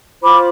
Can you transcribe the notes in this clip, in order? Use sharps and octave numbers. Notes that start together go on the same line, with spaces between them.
F4 C5 B5 D6